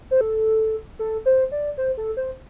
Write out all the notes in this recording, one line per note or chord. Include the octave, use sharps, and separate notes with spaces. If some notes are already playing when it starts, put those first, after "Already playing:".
C5
A4
A4
C5
D5
C5
A4
C5